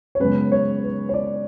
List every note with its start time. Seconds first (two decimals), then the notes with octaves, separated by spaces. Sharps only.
0.15 C#5
0.19 F#2 C#3 G#3 B3 B4
0.52 C#5
0.83 B4
1.09 C#5
1.14 D5